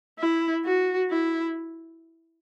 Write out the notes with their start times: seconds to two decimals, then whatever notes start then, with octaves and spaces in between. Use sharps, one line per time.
0.19 E4
0.65 F#4
1.11 E4